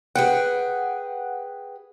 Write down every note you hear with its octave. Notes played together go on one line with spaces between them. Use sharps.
G#4 B4 F#5 G5